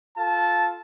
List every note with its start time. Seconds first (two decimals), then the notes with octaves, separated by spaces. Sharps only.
0.17 F4 A4 A5